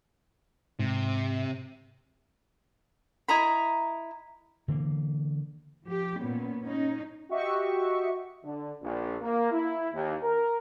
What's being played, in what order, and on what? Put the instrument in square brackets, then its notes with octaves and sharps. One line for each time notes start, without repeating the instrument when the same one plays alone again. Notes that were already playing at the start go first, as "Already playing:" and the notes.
[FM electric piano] G#2 [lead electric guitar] C3
[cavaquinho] E4 D#5 A#5 B5
[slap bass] D3 E3 A#3
[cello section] F3 G4
A#2 B3 C#4
C#4 D#4
[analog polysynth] F#4 G4 D#5 E5 C#6
[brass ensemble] D3
A#1
A#3
E4
D#2
A#4